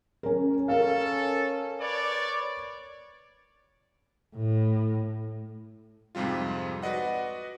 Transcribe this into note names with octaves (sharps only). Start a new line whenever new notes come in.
C#4 A#4
C#4 A4 A#4 F5
B4 C#5 D5
A2
F2 G#2 C3 G3 F4
F#4 B4 D5 D#5 F#5